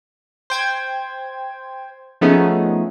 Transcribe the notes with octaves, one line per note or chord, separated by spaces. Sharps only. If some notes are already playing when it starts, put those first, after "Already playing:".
C5 G5 G#6
F3 A3 B3 C#4 D#4 G#4